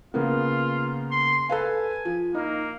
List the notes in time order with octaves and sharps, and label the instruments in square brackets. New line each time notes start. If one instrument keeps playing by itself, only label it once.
[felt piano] C#3 A#3 B3 [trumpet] F4
[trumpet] C6
[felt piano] A4 B4 F5 [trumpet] G#5
[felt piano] F3
[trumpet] A#3 [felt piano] D#4